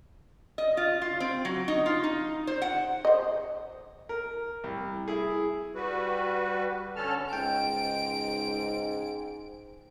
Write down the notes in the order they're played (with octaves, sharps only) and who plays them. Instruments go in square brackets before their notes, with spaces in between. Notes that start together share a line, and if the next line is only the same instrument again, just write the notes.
[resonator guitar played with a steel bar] D#5
F4
F4
C4
F#3
D#4
F4
D#4
C5
F#5
[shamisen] C5 D#5
[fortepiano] A#4
C2
E4 G#4
[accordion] G3 F#4 B4
D3 C#4 A4 A5 F6
[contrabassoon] C#2 [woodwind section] G#2 [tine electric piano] G5 [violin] D7